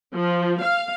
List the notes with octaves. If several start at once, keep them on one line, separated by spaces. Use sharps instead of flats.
F3
F5